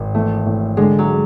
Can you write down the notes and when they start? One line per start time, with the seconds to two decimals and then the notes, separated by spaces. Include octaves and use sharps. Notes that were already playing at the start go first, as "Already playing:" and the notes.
Already playing: G#1
0.14 E3 A3
0.46 A2
0.77 D3 G#3
0.99 F#3